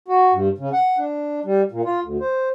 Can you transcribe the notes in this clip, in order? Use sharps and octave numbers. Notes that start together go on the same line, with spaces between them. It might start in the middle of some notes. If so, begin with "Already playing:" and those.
F#4
G2
C#3
F#5
D4
G3
A#2
F4
D2
C5